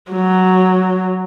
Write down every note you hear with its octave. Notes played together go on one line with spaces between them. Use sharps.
F#3